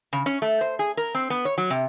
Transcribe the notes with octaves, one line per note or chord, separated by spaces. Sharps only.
C#3
C#4
A3
C5
G#4
A#4
C4
B3
C#5
F#3
C3